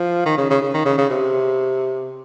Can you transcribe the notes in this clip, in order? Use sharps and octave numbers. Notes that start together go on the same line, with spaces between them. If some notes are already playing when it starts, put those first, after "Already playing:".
Already playing: F3
D#3
C#3
C#3
C#3
D#3
C#3
C#3
C3